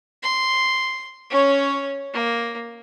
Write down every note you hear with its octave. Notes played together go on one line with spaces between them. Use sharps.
C6
C#4 C#5
A#3